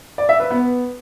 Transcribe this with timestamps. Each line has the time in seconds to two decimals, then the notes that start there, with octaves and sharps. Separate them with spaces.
0.18 D5
0.29 E5
0.40 B4
0.50 B3